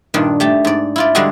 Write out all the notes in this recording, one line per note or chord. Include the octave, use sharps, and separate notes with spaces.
G2 A#2 D#3 D4
A3 G4 A5
G#2 D5
E4 F4 D5
D3 G3 G#3 D4 F#4 G#4